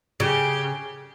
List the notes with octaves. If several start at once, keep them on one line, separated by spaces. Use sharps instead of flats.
C#3 G4